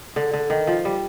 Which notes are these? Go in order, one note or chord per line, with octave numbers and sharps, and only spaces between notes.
D3
D3
D#3
F3
G3